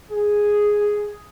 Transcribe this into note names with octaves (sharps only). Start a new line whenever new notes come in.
G#4